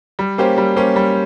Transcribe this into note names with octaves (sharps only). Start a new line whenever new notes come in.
G3
A#3 C#4 G4 C5
G3
A#3 C#4 G4 C5
G3